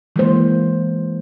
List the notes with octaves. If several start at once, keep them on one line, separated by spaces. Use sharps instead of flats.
E3 G#3 A#3 C5